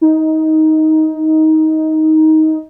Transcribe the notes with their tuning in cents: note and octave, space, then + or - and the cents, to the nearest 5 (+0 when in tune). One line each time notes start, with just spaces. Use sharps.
D#4 +15